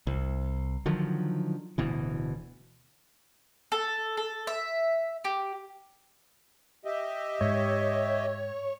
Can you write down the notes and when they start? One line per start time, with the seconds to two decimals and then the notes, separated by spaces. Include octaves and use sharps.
0.07 C2
0.86 D3 D#3 F3 F#3
1.78 D1 D2 B2 E3
3.72 A4
4.17 A4
4.47 E5
5.24 G4
6.85 G4 D#5 E5
7.41 G#2 C#5